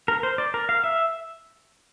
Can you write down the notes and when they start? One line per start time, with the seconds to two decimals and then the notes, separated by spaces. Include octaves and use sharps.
0.08 A#4
0.23 C5
0.38 D5
0.54 A#4
0.69 F5
0.84 E5